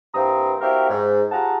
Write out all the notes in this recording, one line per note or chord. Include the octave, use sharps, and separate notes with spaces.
G2 E3 A#3 C4 A#5 D#6
C4 E4 F#4 G4 A#4 F5
G#2
F4 G4 G#4 F#5 A5 A#5